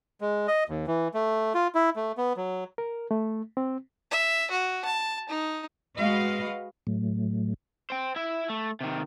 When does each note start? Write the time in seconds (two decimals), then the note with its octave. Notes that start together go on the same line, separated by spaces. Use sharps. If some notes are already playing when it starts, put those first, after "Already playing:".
0.21 G#3
0.48 D#5
0.69 D#2
0.87 E3
1.14 A3
1.54 F4
1.75 E4
1.96 A3
2.18 B3
2.37 F#3
2.78 A#4
3.11 A3
3.57 C4
4.11 E5
4.51 F#4
4.85 A5
5.29 D#4
5.98 G#3 F#4 B4 D#5 F5
6.87 A2 F#3 A3
7.90 C5 G5
8.16 E4 E5
8.50 A3
8.81 C3 D#3